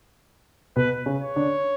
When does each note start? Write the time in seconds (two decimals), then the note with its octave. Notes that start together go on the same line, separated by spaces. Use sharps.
0.76 B2 B3 B4
1.06 C#3 C#4
1.21 C#5
1.36 D3 D4